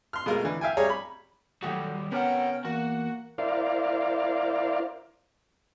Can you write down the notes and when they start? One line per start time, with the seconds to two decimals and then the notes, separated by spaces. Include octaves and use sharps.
0.13 C6 F6
0.26 B2 G#3 A3 F4 A#4
0.43 D3 E3
0.61 E5 F5 G5 G#5
0.77 G3 G#4 C#5 A#5
0.90 B5
1.63 D#3 F#3 G3 A3 F#4
2.12 C3 B3 C#4 A#4 F#5 G5
2.65 E2 A#3 F#4 F#5
3.38 E4 A#4 C5 D5 F5